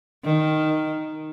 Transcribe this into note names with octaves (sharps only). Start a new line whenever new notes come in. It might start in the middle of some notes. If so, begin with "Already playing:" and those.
D#3